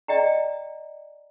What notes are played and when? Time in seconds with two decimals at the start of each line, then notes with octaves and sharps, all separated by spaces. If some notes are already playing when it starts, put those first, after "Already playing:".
0.08 D5 D#5 G5 A#5